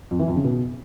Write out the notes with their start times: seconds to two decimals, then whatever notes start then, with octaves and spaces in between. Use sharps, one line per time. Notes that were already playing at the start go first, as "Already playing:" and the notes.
0.11 F2
0.19 E3
0.28 F2
0.36 C#3
0.44 B2